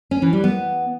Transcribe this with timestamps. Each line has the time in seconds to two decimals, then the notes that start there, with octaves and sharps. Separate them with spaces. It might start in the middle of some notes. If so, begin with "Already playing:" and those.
0.11 C#4
0.22 E3
0.33 G3
0.44 B3